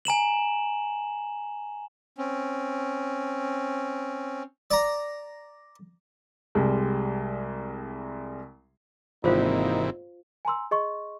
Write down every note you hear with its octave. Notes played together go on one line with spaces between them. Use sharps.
G#5 A#5 E7 F#7
C4 C#4
D5 A#5
C2 G3 G#3
G#1 C3 E3 A#3 D#4 F4 C5 F5
G#5 A#5 C6 E6
G#4 D#5 C6 C#6